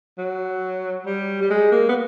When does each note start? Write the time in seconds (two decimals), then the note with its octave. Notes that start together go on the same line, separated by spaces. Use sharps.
0.18 F#3
1.06 G3
1.41 G3
1.50 G#3
1.72 A#3
1.89 B3